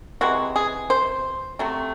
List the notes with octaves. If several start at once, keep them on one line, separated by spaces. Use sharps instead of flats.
C3 E3 G#3 F#4
G#4
C5
C3 F#3 A3